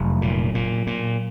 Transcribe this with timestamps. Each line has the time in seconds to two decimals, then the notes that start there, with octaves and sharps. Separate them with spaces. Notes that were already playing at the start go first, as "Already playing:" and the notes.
Already playing: F1 F#3
0.22 A#2
0.55 A#2
0.87 A#2